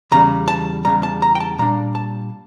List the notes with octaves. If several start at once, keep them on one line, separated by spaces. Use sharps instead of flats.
E2 C#3 G3 A#5
A5
E2 C#3 G3 A#5
A5
A#5
G5
A5
A#2 G3 D4 A#5
A5